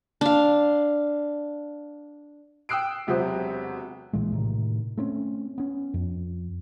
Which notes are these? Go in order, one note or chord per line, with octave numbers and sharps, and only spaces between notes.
D4 F5
G5 D#6 E6 F#6 C7 D7
E1 C3 F#3 F#4 C5 D#6
A#1 A#2 E3 G#3
A2 C3 D#3
A3 C4 C#4
B3 C#4
F2